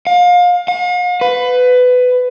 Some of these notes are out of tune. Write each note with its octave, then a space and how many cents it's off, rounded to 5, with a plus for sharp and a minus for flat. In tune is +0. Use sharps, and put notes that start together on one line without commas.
F5 +30
F5 +45
B4 +20